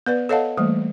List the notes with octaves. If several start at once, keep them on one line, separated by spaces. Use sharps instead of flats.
B3 B4 D5
A4 C#5 D#5 F5 F#5 A5
E3 G3 A3 A#3